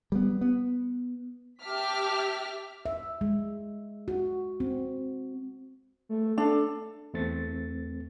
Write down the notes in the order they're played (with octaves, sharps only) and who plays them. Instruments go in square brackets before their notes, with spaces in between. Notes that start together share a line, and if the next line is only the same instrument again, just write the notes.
[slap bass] G3 B3
B3
[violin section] G4 E5 A5 D6 F6 B6
[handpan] E5
G#3
F#4
C4
[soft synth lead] A3
[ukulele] D4 [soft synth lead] A4
[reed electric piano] E2 A3 C4 A6